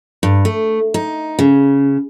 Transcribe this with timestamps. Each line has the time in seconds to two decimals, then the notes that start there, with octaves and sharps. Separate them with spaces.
0.23 G2
0.45 A3
0.94 D#4
1.39 C#3